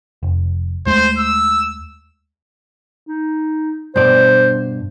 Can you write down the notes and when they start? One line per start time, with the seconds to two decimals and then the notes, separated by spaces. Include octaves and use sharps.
0.23 F1
0.86 D#2 G#3 A3 C5
1.18 E6
3.07 D#4
3.96 G2 B2 C5 D5